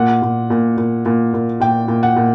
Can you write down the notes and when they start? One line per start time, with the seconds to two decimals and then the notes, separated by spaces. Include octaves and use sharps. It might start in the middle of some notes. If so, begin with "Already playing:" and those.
Already playing: A#2 F#5
0.22 A#2
0.50 A#2
0.77 A#2
1.06 A#2
1.34 A#2
1.60 A#2 G5
1.88 A#2
2.03 F#5
2.16 A#2